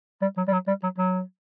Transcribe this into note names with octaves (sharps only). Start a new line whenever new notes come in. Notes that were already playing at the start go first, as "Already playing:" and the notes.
G3
F#3
G3
F#3
G3
F#3
F#3